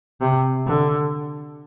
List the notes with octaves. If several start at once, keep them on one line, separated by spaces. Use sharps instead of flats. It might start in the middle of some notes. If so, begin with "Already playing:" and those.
C3
D3